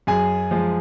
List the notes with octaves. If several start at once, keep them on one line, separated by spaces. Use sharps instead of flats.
F#2 G#4 G#5
F3 G#3